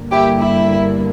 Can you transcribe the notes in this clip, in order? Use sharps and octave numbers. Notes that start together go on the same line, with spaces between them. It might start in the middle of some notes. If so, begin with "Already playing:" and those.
Already playing: G1 G2 D3 A#3
E4 G4
E4